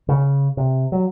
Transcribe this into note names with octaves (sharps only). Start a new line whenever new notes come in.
C#3
C3
F#3